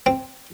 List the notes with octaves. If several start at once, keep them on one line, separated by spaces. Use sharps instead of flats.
C4